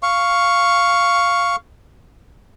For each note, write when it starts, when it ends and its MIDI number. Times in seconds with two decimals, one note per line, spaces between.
0.03 1.56 77
0.03 1.56 85